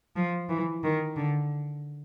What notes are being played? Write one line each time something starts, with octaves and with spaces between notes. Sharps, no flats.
F3
E3
D#3
D3